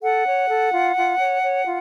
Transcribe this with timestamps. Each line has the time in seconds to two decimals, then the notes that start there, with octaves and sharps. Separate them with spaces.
0.02 A4 F#5
0.25 C#5
0.49 A4
0.72 F4
0.96 F4
1.18 C#5
1.42 C#5
1.65 F4